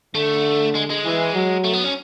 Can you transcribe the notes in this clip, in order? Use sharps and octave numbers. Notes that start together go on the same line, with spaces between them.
D3 A3
G#3
G#3
E3
F#3
A3
B3
C#4